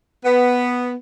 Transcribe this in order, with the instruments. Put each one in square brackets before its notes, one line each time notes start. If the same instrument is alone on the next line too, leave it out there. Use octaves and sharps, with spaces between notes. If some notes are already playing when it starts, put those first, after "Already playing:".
[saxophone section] B3